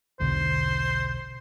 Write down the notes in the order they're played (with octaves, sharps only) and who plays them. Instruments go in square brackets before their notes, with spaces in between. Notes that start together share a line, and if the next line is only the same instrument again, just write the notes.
[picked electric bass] E1 B1 D3 [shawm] C5